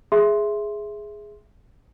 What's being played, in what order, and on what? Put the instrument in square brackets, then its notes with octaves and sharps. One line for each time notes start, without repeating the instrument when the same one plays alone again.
[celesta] G#4 E5 C6